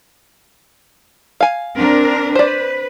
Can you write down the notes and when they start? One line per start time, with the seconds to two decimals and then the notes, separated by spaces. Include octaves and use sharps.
1.41 F5 G#5
1.76 C4 D4 A#4
2.35 B4 C5 D5